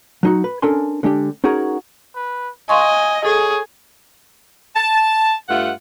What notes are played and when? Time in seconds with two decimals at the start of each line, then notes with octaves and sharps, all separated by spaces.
0.23 F#3 D#4 F#4
0.44 B4
0.62 C#4 D4 A4 A#4 G#5 C6
1.03 D3 G#3 D4 G4
1.44 C#4 D#4 F#4 G#4 A#4
2.15 B4
2.69 D#5 F5 G#5 C6 C#6
3.25 G#4 A4 C#5
4.76 A5
5.48 G2 A3 F4 F#5